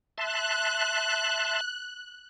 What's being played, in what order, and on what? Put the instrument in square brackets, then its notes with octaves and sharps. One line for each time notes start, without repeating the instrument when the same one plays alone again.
[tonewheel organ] E5 A5 C6 [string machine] F#6